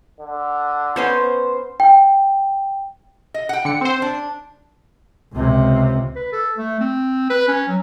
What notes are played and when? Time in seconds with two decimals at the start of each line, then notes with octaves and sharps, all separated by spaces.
0.20 D3
0.96 B3 C#4 C5 D#5
1.80 G5
3.34 D#5
3.49 F#5 G5
3.65 D3 C#7
3.81 C4 C5
4.02 D4
5.33 C#2 C3
6.16 B4
6.33 A4
6.58 A3
6.80 C4
7.30 B4
7.48 C#4
7.68 F#3